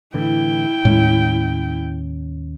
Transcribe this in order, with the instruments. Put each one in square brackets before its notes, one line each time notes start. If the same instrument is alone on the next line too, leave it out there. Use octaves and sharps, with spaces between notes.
[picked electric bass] A2 D3 E3 [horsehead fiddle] E4 G5
[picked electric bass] D#2 C#4 [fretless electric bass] A2 G#3